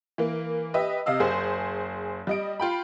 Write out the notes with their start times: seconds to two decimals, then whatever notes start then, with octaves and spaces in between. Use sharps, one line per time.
0.18 E3 A#3
0.74 G4 B4 D#5 E5
1.06 C3 D#5 F5 E6
1.20 F#1 G#4 C5
2.27 G3 D#5 D7
2.60 F4 G5 B5